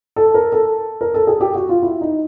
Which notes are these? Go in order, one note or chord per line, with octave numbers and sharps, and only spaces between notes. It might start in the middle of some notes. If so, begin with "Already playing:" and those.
A4
A#4
A4
A#4
A4
G#4
G4
F#4
F4
E4
D#4